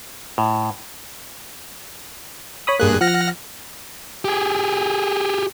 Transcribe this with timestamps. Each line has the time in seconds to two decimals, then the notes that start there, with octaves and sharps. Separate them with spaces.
0.38 A2
2.67 C#5 B5 D#6
2.80 G2 A#3 G#4 F#6
3.01 F3 F#5 F6 A#6
4.25 G4 G#4